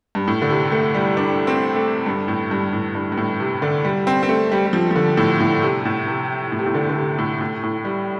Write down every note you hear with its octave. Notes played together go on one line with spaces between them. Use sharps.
G2
A2
D3
C3
A3
G3
D4
C4
A3
G2
A2
G2
A2
G2
G2
A2
C3
D3
G3
C4
C4
A3
G3
G3
F3
F3
D3
A2
A2
C3
A2
C3
A2
C3
A2
D3
D3
C3
A2
A2
A2
G3